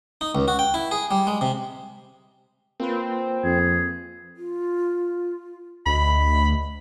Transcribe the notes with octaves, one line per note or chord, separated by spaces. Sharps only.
D#4
C#2
F#4
G5
E4
G#4
G3
G#3
C3
A#3 C4 F4 B4
F2 G#4
F4
D2 D#5 B5